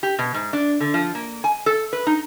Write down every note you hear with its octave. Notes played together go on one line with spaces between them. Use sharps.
G4
B2
G#2
D4
D3
F3
A#3
G#5
A4
B4
D#4